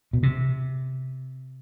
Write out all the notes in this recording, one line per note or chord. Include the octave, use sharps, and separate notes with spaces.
B2
C3